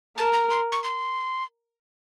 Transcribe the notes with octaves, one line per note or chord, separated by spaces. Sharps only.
A#4 A5
A#5
C6
C#6
C6